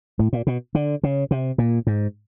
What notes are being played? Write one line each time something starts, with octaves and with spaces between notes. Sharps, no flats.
A2
A#2
B2
D3
C#3
C3
A#2
G#2